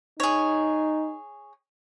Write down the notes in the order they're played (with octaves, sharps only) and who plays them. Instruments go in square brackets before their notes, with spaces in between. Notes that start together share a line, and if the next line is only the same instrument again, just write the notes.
[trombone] D#4 [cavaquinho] G#4 C#5